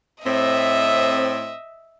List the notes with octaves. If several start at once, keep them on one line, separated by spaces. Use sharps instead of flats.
A2 C4 D#5 E5